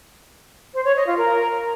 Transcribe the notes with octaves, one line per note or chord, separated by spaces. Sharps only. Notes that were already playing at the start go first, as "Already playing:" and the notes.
C5
C#5
D#5
F4
A#4